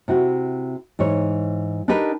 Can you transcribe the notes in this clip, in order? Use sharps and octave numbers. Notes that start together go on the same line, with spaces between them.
C3 E4 F#4
G#2 E3 C#5
D4 D#4 G4 A#4 B4